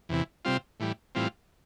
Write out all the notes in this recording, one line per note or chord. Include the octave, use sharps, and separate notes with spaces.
E2 C3 E3
C3 G3 C4 F4
A2 E3 G3
A2 E3 G3 C4 F4